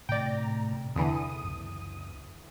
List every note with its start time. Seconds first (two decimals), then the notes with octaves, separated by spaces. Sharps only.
0.09 A2 C3 D#3 D5 G5 A#5
0.96 E2 D3 E3 D#6
1.44 C#2 F#2